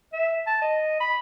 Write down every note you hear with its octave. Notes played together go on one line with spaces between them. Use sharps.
E5
A5
D#5
B5